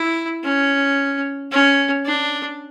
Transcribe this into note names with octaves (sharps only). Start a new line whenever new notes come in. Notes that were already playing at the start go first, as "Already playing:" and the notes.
Already playing: E4
C#4
C#4
D4